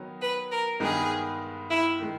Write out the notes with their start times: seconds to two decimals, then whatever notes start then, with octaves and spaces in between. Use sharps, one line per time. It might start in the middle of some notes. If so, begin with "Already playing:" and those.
Already playing: D#3 F#3 B3 D#4
0.21 B4
0.51 A#4
0.80 G2 D#3 G#3 B3 D#4 G#4
1.70 E4
2.00 D#3 G#3